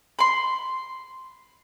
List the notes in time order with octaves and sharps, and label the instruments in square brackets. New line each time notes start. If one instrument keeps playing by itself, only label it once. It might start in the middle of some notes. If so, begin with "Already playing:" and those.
[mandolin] B5 C6